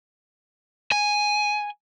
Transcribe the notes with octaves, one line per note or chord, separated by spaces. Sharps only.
G#5